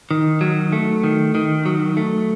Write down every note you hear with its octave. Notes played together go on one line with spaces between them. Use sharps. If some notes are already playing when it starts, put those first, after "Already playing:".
D#3
F#3
A3
D#3
D#3
F#3
A3